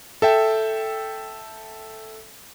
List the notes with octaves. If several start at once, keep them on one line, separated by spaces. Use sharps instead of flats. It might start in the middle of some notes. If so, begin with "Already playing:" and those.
A4 E5 G5